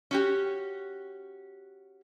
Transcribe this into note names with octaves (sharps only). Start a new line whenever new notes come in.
C#4 F#4 G4